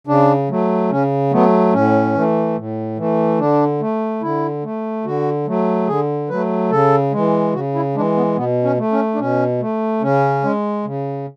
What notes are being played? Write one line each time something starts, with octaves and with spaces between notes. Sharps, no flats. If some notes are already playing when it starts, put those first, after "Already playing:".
C#3 D4
F#3 A3
C#3 C#4
F#3 A3 B3
A2 C#4
E3 A3
A2
E3 A3
D3 D4
A3
D3 E4
A3
D3 F#4
F#3 A3
D3 G#4
F#3 A3 B4
C#3 A4
E3 G#3
C#3 F#4
E4
E3 G#3 D4
B3
B2 B3
C#4
A3
C#4
D4
B2 C#4
A3
C#3 C#4
G#3
C#3